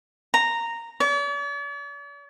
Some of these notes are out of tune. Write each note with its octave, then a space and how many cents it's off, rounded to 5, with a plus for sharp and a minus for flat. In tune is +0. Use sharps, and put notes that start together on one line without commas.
A#5 -10
D5 -45